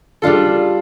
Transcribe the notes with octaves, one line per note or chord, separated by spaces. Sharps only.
G3 D4 F4 A4